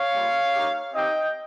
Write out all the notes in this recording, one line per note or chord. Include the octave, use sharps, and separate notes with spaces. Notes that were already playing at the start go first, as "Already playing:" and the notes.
Already playing: C#5 F5
G3 A#3 F4
A#3 D#4 G4
C4 D#4 G4 D#5 G5